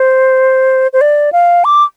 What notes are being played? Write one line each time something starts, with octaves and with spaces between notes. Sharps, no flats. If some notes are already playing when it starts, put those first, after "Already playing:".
Already playing: C5
C5
D5
F5
D6